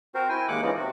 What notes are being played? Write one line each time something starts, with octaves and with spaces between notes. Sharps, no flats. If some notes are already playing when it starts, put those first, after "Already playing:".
C4 F#4 A#4 C5
E4 G5 G#5
D#2 G#3 A#3 F#5 D6 F#6
E3 F3 G#3 B3 C#4 D#4
C3 F#4